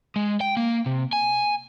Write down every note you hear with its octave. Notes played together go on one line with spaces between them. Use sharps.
G#3
G5
A#3
C3
G#5